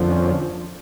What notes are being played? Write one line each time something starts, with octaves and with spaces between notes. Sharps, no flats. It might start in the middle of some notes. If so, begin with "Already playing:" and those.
Already playing: F2 D3 F3
C#4